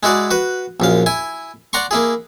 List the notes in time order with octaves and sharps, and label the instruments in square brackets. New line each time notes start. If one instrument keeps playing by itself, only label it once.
[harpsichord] G#3 E4 F#4 G#4 D5
F#4 B4
A#1 F#2 F5
E4 G#5
D5 F#5 A#5 C6 C#6
A#3 E4 G#4